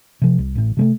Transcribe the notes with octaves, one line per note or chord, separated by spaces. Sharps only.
C3 F3
C2
A1 A2
C3 G#3 A3